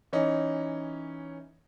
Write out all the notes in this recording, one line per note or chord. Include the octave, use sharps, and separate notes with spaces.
E3 C#4 D#4